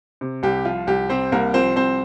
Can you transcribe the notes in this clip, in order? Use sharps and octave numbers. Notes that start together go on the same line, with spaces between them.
C3
C2 G4
F3 F4
C2 G4
C3 C4 C5
C2 A#3 A#4
F3 C4 C5
C2 C4 C5